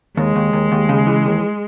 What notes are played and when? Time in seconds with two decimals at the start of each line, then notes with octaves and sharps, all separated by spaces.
0.17 D#2 G#3
0.36 D#2
0.53 D#2
0.72 D#2
0.89 C#3
1.07 E3
1.25 D#2